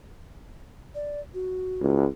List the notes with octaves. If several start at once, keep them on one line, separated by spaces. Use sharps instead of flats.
D5
F#4
C#2